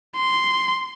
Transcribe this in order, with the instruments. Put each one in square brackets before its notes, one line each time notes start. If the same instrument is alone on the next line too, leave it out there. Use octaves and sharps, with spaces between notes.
[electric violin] C6